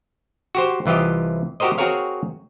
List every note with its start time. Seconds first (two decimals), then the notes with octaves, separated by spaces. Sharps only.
0.55 F#4 G4 C5
0.86 C2 E3 F4 G4 D#5
1.60 F#4 G4 A#4 C5 D#5
1.78 C4 F#4 G#4 A#4 C#5 F5